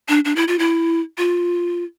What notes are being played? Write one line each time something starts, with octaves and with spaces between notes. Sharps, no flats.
D4
D4
E4
F4
E4
F4